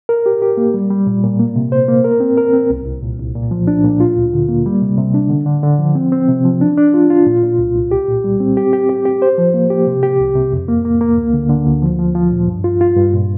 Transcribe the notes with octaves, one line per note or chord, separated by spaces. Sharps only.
A#4
G4
G4
A#3
G3
G3
A#2
A#2
A#3
C3
C5
A#3
A#4
C4
A#4
C4
C2
C2
A#2
C2
A#2
F3
D4
A#2
F4
D2
D3
A#3
G3
C3
C3
D4
D3
D3
D3
F3
C4
C4
C3
F3
D4
D4
F4
F4
A#2
A#2
C2
C2
G4
A#2
G3
C4
G4
G4
G4
G4
C5
F3
A#3
G4
C3
G4
C2
C3
F2
A#3
A#3
A#3
D2
D3
D3
D2
F3
F3
F3
A#2
G2
F4
F4
G2
A#2